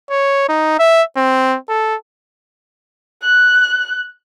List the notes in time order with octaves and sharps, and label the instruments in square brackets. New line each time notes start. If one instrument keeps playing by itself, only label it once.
[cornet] C#5
D#4
E5
C4
A4
[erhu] F#6